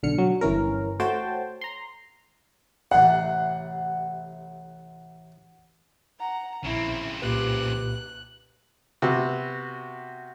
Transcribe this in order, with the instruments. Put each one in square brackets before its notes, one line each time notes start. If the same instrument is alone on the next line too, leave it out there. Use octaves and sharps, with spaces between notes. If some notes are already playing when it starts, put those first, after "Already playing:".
[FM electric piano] B1 D3 F6 C#7
F#3
G1 E3 C#4 A#4
A3 F#4 C5 C#5 G5 A5
A#5 C6
[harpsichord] A1 A2 C3 [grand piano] F#5
[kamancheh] F#5 A#5
[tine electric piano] A#1 [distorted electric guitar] C#3 C4 [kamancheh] E4
[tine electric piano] C2 A#2 B4 [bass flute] G4 [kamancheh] F#6
[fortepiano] C3 B3 F#4